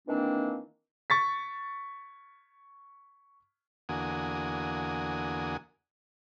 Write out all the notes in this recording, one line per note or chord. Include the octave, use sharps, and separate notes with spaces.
D#3 E3 A#3 C4 D4
C#6 A6 B6
E2 D3 A#3 F#4 G#5 D#6